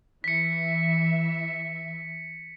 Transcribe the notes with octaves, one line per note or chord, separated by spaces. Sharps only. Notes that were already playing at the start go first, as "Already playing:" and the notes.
E3 E5 B6 C#7